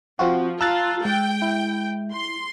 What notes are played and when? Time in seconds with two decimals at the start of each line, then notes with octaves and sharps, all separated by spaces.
0.19 F3 C4 F4 F#4
0.61 F4 F5 A5 A#5 E6 F#6 A6
1.05 G#3 G5
1.42 E4
2.12 C6